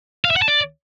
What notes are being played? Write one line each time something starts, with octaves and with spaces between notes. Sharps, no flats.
F5
E5
F#5
A5
D5